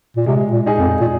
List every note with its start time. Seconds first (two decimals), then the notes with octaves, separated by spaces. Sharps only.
0.17 A#2
0.26 C3 G#3
0.53 A#2
0.66 D#4 G#4
0.79 F2
1.01 A#2